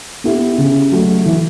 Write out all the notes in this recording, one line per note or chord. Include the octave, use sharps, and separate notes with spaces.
B3 E4 G4
C#3
F#3 A3
E3